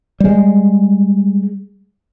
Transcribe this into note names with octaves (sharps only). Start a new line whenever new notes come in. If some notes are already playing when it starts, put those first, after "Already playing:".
G3 G#3